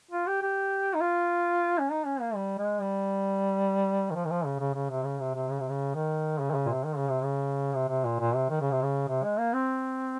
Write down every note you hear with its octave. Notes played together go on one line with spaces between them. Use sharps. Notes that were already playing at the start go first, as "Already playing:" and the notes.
F4
G4
G4
D#4
F4
C#4
D#4
C#4
A#3
G3
G#3
G3
D#3
F3
D#3
F3
C#3
C#3
C#3
C3
C#3
C3
C3
C#3
C3
C#3
D#3
C#3
D#3
C#3
A#2
C3
D#3
C#3
C3
C#3
C3
C3
A#2
A#2
C3
D#3
C#3
C3
C#3
C3
G#3
A#3
C4